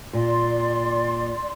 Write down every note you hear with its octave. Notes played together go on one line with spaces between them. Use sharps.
A#2 D5 C6